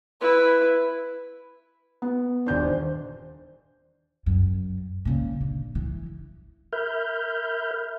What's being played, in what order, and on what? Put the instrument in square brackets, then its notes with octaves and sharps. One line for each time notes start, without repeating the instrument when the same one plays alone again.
[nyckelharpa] E4 B4
[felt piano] B3
[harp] D#1 C5 [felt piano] D4 G6
[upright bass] F#2
A#2 C#3
D3
E3
[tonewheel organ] A#4 E5 B5 F6 G6